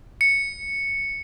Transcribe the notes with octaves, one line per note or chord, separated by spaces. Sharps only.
C#7